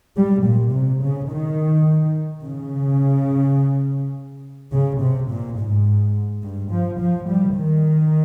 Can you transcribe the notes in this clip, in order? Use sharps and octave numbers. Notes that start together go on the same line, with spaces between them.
G3
A#2
C3
C#3
D#3
C#3
C#3
C3
A#2
G#2
G2
F3
F3
G3
D#3